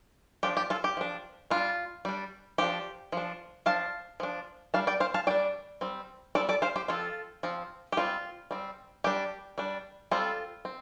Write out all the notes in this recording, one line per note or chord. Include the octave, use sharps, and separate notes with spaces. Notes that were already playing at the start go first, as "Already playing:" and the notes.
F3 D4 G4
G4
F4 A4
G4
F3 D4
G3 D4 F4
G3 D4
F3 D4 G4
F3 D4
F3 D4 F5 A5
F3 D4
G3 D4 F5 A5
D5 G5
C5 F5
F5 A5
G3 D4 D5 G5
G3 C4
G3 C4 A4 D5
A4 D5
C5 F5
G4 C5
F3 C4 F4 A4
F3 C4
G4
G3 C4 F4
G3 C4
G3 D4 G4
G3 D4
G3 C4 F4 A4
C4